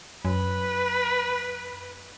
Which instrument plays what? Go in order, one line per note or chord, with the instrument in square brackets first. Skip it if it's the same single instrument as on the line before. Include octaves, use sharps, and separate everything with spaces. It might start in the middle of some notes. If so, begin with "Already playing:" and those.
[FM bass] F#2 [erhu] B4